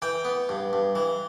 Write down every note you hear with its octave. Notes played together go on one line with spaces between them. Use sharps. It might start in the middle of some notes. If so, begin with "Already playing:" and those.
E3 G5
B3
G2
G2
E3